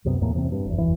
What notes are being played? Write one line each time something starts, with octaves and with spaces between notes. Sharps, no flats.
C2 F#2 C3 B3
E2 A2 A#3
C3 E3 G#3 C4
G2
F#1 E2
F#1 D#2 E3